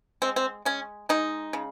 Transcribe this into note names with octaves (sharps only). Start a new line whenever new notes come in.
G#3 C4
C4
G#3 C#4
G#3 D#4
C#3